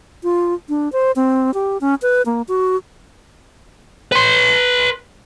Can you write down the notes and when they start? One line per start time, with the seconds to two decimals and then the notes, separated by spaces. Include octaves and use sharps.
0.23 F4
0.69 D4
0.92 C5
1.16 C4
1.54 G4
1.81 C#4
2.02 B4
2.26 A#3
2.48 F#4
4.12 B4 C6